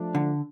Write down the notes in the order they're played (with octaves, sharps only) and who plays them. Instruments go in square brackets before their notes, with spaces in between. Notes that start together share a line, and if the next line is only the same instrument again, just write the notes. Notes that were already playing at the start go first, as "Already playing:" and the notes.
Already playing: [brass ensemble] F3 A3 D4
[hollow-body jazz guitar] D3